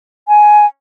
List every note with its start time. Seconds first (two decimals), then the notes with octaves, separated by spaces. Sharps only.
0.28 G#5